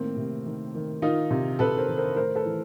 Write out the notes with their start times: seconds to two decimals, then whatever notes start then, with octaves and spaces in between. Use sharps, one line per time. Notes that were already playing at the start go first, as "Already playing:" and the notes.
Already playing: A2 D#3 A#3 C4
0.17 C3
0.46 D#3
0.75 D#3
1.02 D#3 D#4 F4
1.30 C3
1.59 C3 A4 B4
1.78 A#4 C5
1.88 D#3
1.97 A#4 C5
2.16 A2 A#4 C5
2.35 A4 B4
2.45 E3